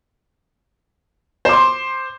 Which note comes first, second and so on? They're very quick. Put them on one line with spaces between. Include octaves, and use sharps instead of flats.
C5 D6 C6